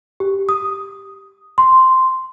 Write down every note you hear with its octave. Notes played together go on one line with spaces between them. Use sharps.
G4
D#6
C6